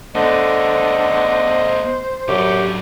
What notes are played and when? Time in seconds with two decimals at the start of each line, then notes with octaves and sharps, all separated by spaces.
0.15 D3 A3 B3 C5 D#5
2.28 F#2 D3 F#3 G4